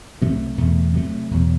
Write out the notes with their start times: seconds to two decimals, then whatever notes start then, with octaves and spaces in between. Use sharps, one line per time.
0.21 C2 C3 F#3 A3
0.57 E2 B2 A3
0.94 C3 F#3 A3
1.31 E2 B2 F#3